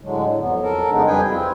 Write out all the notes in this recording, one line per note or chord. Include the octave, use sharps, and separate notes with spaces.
A2 D3 F#3 G#3
F2 F#3 B3
A4 A#4
F2 C#3 G#3 B3 D4 D#4
F2 G3 G#4 B4 G5 G#5
C4 E4 F4